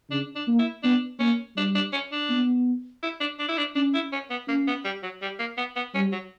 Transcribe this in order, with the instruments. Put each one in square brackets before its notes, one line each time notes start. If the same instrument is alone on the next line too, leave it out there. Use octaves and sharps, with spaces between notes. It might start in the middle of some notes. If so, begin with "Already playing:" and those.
[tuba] C#3 [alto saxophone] D4
[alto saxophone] D4
[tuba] A#3
[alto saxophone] E4
[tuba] B3 [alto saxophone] D4
[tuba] A#3 [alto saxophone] C#4
[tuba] G3 [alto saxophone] D4
[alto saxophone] D4
C#4
D4
[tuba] B3
[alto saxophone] E4
D4
D4
E4
D4
[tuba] C#4 [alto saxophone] D4
[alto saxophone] E4
C#4
B3
[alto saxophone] A#3 [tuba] C#4
[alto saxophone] B3
G3
F#3
G3
A#3
B3
B3
[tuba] G3 [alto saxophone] C#4
[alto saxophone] F#3